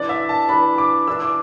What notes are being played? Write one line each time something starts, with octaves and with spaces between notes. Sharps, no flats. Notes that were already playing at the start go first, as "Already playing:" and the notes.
Already playing: E3 D4 D5
E5
A5
E3 D4 B5
D6
E3 D4 E6
D6